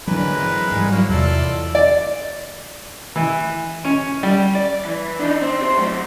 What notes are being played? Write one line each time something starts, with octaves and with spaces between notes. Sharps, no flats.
D3 E3 F#3 G#3 A#4 B4
E3 C4
G#2 E3 G3
F#3 A#3 C#4 E4
E2 C3 F4 A4 D5
D#5
D5
E3
C#4
G3
D5
E3
D4 D#4
C4
G4 C5
F#3 A3